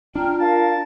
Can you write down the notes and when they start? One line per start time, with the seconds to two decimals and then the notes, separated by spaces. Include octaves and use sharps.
0.15 D4 F4 G5 A#5 F6
0.39 A#4 F5 A5